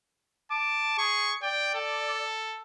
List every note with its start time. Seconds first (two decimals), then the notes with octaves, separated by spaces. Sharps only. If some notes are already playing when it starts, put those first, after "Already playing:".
0.51 A5 D6
0.98 G#4 C#6
1.43 D5 G5
1.75 A4